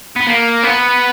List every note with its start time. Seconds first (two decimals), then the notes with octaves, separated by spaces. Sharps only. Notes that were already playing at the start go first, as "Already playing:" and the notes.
0.16 B3
0.27 A#3
0.63 B3